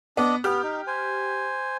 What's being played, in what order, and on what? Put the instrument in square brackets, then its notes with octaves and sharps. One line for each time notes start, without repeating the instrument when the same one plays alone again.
[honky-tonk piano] B3 [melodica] D4 D#5
[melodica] B3 [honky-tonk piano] G4 F6
[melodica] D#4
C5 G#5